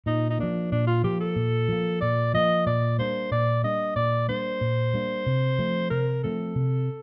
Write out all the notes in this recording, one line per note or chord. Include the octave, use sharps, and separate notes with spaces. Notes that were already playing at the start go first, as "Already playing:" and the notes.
A#2 D#4
D#4
F3 A#3 D4
A#2 D4
F4
F3 A#3 G4
A4
A#2
F3 A#3
A#2 D5
F3 A#3 D#5
A#2 D5
G3 A#3 D4 C5
A#2 D5
G3 A#3 D4 D#5
A#2 D5
G3 A#3 D4 C5
A#2
G3 A#3 D4
C3
F3 A3 C4
C3 A#4
F3 A3 C4 A4
C3